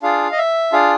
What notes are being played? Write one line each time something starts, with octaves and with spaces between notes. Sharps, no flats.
D4 F4 G#4 F5
D#5
E5
D4 F4 G#4 F5